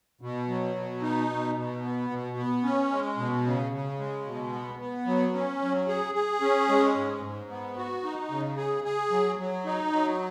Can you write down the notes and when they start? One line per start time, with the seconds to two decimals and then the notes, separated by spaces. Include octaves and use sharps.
0.21 B2
0.48 F#3
0.76 B2
1.02 D#4
1.29 B2
1.56 B2
1.83 B3
2.11 B2
2.37 B3
2.64 C#4
2.91 G#3
3.17 B2
3.45 C#3
3.72 C#3
3.99 G#3
4.26 B2
4.53 B3
4.79 B3
5.06 F#3
5.34 C#4
5.61 F#3
5.88 G#4
6.15 G#4
6.41 C#4
6.69 G#3
6.95 G#2
7.22 G#2
7.50 B3
7.76 F#4
8.04 D#4
8.30 C#3
8.57 G#4
8.84 G#4
9.11 F#3
9.39 F#3
9.65 D#4
9.92 F#3